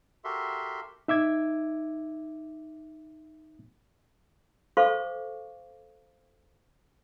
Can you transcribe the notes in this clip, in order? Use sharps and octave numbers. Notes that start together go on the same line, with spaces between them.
F#4 G4 A4 A#4 E5 C6
D#4 E5 D6 G#6
A4 C5 F5 C#6 D6